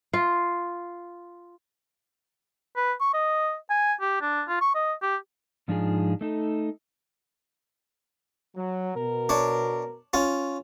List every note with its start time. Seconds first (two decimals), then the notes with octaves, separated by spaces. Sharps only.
0.13 F4
2.76 B4
3.01 C#6
3.14 D#5
3.70 G#5
4.01 G4
4.22 D4
4.48 F4
4.61 C#6
4.75 D#5
5.02 G4
5.68 G#2 F3 D4 D#4 F4 G#4
6.21 A3 D#4 A4
8.56 F#3
8.96 B2 A#4
9.29 D4 C#5
10.13 C#4 F4